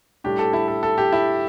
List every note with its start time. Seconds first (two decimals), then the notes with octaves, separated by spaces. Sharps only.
0.24 A2 G3 D4 G4
0.39 A4
0.53 E4
0.68 A4
0.83 A4
0.98 G4
1.12 E4